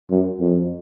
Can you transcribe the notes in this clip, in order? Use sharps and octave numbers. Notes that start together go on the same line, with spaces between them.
F#2
F2